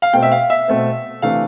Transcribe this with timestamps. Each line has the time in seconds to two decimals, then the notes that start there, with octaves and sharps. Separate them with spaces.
0.02 F5
0.13 B2 A3 C4 G5
0.23 E5
0.32 F5
0.50 E5
0.68 B2 A3 C4
1.22 C3 E3 A3 D4 F5